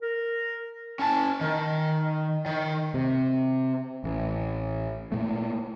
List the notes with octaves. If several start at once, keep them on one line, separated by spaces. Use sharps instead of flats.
A#4
C#4 A5
D#3
D#3
C3
A1
A#2 A3